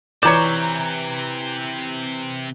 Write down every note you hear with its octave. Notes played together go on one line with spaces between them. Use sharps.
C3 E3 C4 C#5 D5 A#5 G6 E7